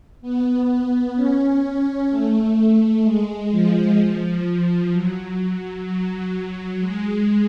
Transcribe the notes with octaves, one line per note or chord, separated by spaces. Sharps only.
B3
C#4
A3
G#3
F3
F#3
F#3
G#3